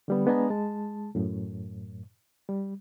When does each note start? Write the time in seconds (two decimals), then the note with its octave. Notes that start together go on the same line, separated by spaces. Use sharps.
0.08 D3 G3 B3
0.26 G#3 B3 D4 D#5 G#5 A#5
0.50 G#3 A5
1.15 F#2 A2
2.49 G3